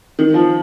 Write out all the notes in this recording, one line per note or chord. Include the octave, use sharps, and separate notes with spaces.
D#3
F3